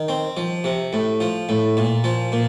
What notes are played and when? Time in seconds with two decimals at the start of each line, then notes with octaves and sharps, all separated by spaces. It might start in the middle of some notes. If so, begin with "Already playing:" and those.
Already playing: D#3
0.08 C4
0.37 F3
0.64 C3
0.93 A2
1.20 F3
1.49 A2
1.77 A#2
2.04 F3
2.32 A#2